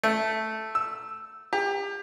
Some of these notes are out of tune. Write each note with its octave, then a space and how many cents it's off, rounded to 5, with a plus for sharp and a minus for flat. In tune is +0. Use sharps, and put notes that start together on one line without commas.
A3 +0
E6 +0
G4 +30